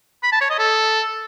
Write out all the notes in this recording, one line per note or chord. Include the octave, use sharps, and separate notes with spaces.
B5
A5
C#5
D#5
A4